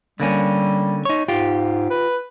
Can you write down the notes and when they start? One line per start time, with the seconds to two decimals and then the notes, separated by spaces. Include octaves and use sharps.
0.20 D3 G3 A#3 C#4
1.05 D#4 C#5
1.28 G#2 F4 G4
1.91 B4